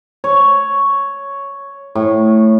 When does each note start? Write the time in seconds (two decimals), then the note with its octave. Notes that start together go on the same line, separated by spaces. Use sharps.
0.24 C#5
1.95 A2